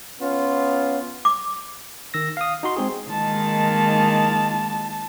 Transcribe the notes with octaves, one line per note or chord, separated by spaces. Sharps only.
B3 C#4 F4
D6
D#3 E6 A#6
F5 D#6
D#4 F#4 C6
G#3 C4 G#4
D#3 G#3 A#3 A5